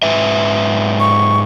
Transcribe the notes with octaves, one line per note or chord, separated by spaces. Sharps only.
G#2 B4 E5
C#6